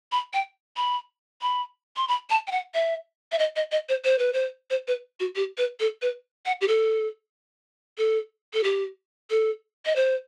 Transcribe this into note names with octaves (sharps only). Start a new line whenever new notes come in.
B5
G5
B5
B5
C6
B5
A5
G5
F#5
E5
E5
D#5
D#5
D#5
C5
C5
B4
C5
C5
B4
F#4
G4
B4
A4
B4
F#5
G4
A4
A4
A4
G4
A4
D#5
C5